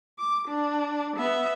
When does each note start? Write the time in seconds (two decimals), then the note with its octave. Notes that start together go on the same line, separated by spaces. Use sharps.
0.19 D6
0.48 D4
1.17 B3 E5